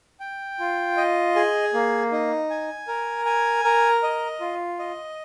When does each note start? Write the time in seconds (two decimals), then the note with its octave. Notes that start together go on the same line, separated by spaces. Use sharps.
0.20 G5
0.59 F4
0.97 D#5
1.36 G#4
1.74 A#3
2.12 D#4
2.50 G#5
2.88 A#4
3.25 G#5
3.64 A#4
4.03 D#5
4.40 F4
4.79 D#5